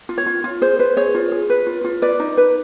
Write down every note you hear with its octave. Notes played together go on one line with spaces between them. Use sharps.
F4
C#5
F4
F4
G#4 C5
B4 C5
G#4 C#5
F4
G#4
B4
F4
F4
B4 D5
D#4
B4